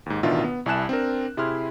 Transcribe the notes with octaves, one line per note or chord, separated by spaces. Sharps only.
D#2 G#2
A1 B2 D#3 D4 F4 E5
B3
C2 E4 G#5 A5 F#6 E7
C4 D4 A#4
C3 E4 G#4 C6 F6